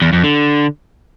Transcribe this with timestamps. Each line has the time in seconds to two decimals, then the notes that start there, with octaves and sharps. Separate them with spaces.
0.02 E2
0.13 F2
0.24 D3